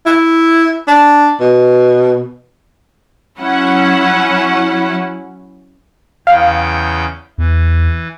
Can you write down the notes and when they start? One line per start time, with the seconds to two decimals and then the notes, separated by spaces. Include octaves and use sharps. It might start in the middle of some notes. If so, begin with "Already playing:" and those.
0.06 E4
0.88 D4
1.40 B2
3.39 F#3 C#4 E4 F#5
6.27 E2 C#3 F5 G5
7.38 E2 E3